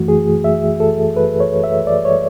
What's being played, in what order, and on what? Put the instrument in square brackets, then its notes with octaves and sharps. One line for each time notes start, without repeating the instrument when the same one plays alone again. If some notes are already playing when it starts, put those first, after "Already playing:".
Already playing: [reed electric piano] F#2 E3 A3 F#4
G#4
E5
A4
B4
C#5
E5
D5
C#5